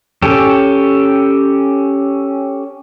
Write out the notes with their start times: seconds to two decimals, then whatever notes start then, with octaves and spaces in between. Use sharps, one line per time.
0.22 C#4 G4 A4